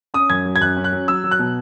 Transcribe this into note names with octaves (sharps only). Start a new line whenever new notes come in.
C#4 D#6
F#2 G#6
F#3
G#6
F#2 F#6
C#4
F#6
F#3
F#3 E6
F#3
F#6
B2